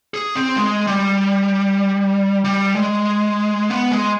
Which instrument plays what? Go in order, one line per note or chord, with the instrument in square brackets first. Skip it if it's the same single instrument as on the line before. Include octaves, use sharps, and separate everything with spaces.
[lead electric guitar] G#4
C4
G#3
G3
G3
G#3
B3
G#3